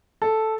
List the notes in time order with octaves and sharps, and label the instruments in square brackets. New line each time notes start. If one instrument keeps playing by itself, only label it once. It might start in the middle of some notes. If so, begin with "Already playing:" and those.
[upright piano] A4